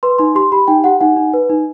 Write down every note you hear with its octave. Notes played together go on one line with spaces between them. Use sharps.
B4 C6
D#4 C6
G4 C6
G4 B5
D#4 G5
G4 F#5
D#4 F#5
D#4
B4
D#4